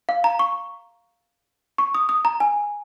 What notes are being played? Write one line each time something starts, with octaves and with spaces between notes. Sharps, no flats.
F5
A#5
C#6
C#6
D#6
D#6
A#5
G#5